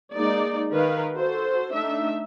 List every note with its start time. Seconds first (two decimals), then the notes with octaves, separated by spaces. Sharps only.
0.14 G#3 A#3 D#4 D5
0.73 D#3 A#4 B4 F5
1.14 F#4 A4 C5
1.72 A3 D4 D#4 E5